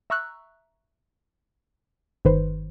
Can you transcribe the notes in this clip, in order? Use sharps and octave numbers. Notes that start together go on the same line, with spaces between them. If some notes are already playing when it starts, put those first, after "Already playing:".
E5 A#5 C#6 E6 F#6
G1 D#3 B4 C5